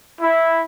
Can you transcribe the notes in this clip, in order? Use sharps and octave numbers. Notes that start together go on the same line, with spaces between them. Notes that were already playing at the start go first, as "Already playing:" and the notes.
E4